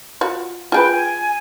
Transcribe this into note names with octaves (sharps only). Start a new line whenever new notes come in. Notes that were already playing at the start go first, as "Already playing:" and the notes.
F4 F#4
F4 G#4 B4 G5
G#5